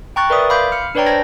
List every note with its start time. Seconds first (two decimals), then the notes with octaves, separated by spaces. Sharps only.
0.16 G5 A#5 C#6 F#6 A6
0.30 A#4 B4 D5 E5 D#6
0.50 F5 B5 C6 D6 G6
0.72 F6 C#7
0.95 D4 B4 C#5 D5 G5 A#5
1.06 C5 A5 G#6 A#6